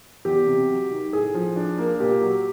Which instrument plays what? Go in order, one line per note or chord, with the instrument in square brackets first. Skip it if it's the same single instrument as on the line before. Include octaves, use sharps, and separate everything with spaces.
[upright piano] E2 [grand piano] G4
[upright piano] C3
F#3
D#3
[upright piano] A2 [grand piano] G#4
[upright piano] F3
D4
A#3
[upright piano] A#2 [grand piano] G4
[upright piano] F#3